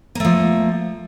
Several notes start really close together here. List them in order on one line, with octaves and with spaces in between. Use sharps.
A#3 A3 F3